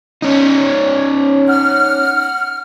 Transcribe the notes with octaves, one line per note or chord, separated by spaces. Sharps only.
C#4 D#4
F#5 F6